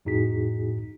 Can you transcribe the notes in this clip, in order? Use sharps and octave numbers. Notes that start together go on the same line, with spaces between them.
F2 A2 D#4 F#4 G#4 B6